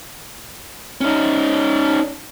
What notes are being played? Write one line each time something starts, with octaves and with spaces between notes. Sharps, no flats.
C#4 D#4